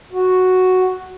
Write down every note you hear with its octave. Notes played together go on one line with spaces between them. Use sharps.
F#4